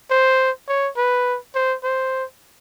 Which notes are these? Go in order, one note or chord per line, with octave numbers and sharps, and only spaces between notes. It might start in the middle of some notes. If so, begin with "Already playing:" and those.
C5
C#5
B4
C5
C5